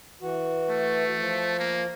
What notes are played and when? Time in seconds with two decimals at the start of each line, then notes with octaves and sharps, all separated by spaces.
0.22 E3 F#4
0.70 A3
1.19 F3
1.59 A#3